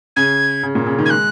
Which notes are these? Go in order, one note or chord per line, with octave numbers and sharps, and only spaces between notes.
C#3 G#6
C#3
A#2
C#3
D#3
G#6
G#3 F#6